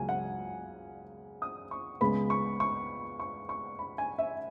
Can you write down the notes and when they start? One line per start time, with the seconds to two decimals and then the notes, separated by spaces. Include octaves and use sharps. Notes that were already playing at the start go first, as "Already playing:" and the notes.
Already playing: C#2 C#3 F#3 A#3 G#5
0.09 F#5
1.42 D#6
1.71 C#6
2.01 C#2 C#3 G#3 B3 B5
2.30 C#6
2.60 C#6
3.20 C#6
3.49 C#6
3.79 B5
3.98 G#5
4.18 E5